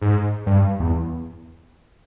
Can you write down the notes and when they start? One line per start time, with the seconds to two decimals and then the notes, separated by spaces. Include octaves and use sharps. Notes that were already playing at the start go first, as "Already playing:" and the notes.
0.01 G#2
0.46 G2
0.80 E2